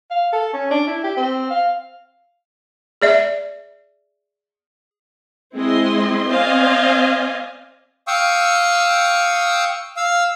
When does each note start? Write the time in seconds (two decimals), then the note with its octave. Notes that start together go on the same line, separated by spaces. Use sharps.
0.11 F5
0.33 A4
0.54 C#4
0.71 D4
0.87 E4
1.04 G4
1.17 C4
1.50 F5
3.02 G#4 D5 E5
5.56 G#3 C4 E4 D#5 C6
6.28 C4 C5 D5 D#5 F5 G#5
8.08 F5 G5 C#6 D#6 E6
9.97 F5 E6